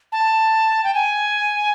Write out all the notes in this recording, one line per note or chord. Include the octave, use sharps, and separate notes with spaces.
A5
G5
G#5